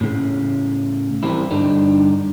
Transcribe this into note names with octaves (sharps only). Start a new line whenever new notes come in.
A2 C#3
E3 G3 C4 E4
G2 D3 D4 D#4